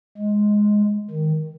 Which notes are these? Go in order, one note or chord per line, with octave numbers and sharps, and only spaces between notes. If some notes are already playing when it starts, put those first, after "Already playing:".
G#3
D#3